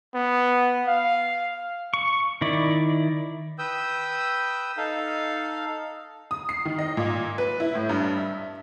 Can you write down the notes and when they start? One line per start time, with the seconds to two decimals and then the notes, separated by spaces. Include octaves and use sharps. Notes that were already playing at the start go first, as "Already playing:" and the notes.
0.14 B3
0.87 F5
1.94 C#6
2.41 D#3 E4 D5
3.58 B4 G5 D#6 E6 G6
4.77 D#4 A4 F5
6.31 D#6
6.49 C7
6.65 D#3
6.79 D#5
6.97 A#2
7.38 B4
7.60 E4
7.75 A2
7.89 G2
8.17 E5